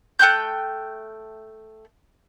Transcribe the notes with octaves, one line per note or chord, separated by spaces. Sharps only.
A3 G5 F#6 G6